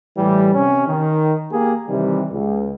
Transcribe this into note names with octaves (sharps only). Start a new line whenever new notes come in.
A2 E3 G3
C3 C#4
D#3
A#3 G4 G#4
C3 D#3 E3 G3
C#2